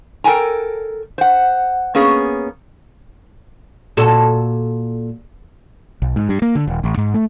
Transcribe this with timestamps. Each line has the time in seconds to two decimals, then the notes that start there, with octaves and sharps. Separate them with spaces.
0.24 A4 A#4 G5 G#5 A#5
1.18 C5 F#5
1.95 A#3 B3 C#4 G#4
3.97 A#2 F#4 A4
6.02 B1
6.16 G#2
6.29 G2
6.42 A#3
6.55 D3
6.67 D#1
6.84 A1
6.97 G#2
7.14 A3